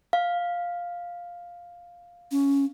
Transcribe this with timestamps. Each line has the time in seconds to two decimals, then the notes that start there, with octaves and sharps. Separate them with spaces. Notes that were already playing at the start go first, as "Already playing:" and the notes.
0.13 F5
2.31 C#4